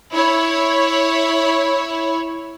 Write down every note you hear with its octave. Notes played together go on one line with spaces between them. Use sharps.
E4 C#5